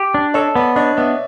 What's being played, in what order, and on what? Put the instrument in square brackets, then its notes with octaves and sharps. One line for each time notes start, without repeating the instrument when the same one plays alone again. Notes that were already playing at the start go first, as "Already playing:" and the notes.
Already playing: [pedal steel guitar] G4
D4
[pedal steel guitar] A4 [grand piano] C#5 D#5
[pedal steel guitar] B3 [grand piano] D5
[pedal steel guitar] D4 [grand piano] C#5 D#5
[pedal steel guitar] B3 [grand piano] D5 E5